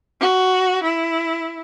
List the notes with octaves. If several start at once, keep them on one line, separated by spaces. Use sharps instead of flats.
F#4
E4